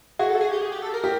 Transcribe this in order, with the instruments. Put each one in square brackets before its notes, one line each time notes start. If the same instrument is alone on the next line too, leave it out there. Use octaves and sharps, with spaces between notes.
[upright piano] F#4 [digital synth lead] G#4
[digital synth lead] A4
G#4
G4
G#4
G4
A4
A#4
[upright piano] G4